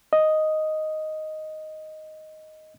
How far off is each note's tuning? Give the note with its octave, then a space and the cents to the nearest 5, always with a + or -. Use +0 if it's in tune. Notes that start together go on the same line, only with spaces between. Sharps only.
D#5 +0